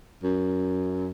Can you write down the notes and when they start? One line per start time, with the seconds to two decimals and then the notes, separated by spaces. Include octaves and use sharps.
0.23 F#2